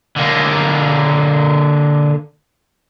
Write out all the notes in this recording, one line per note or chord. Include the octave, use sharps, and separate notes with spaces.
D3 A#3